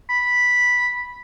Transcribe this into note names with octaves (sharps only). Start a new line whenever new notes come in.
B5